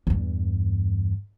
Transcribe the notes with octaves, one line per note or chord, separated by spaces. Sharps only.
E2 G2